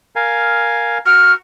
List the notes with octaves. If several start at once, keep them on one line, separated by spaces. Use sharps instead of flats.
A#4 F5 G#5
F#4 C#6 F6